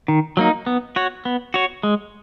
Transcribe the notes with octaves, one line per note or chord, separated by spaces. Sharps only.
D#3
F#3 A#3 D#4
B3
F#4 C#5
B3
F#4 C#5
G#3